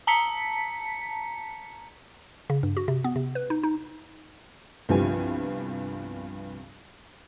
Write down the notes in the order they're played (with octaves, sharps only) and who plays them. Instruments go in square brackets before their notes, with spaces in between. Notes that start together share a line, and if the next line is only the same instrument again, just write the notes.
[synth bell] A5 A#5 B6 C#7
[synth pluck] C#3
G2
F#4
C3
B3
C3
B4
D#4
D#4
[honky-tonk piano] C2 G2 F3 B3 G4 G#5